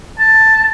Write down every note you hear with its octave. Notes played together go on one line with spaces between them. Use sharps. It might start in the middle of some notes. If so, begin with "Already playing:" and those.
A5